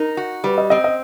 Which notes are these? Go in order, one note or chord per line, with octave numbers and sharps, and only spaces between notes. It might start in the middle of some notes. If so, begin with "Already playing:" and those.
Already playing: D#4 A#4
F#4
G3 B4
D#5
C4 D#5
D#5